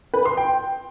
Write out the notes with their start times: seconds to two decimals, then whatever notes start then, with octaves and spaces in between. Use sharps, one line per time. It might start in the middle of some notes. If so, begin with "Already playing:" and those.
0.14 B4
0.25 C6
0.37 G5